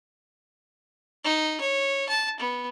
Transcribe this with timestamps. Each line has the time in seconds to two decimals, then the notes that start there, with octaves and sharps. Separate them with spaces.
1.25 D#4
1.61 C#5
2.09 A5
2.40 B3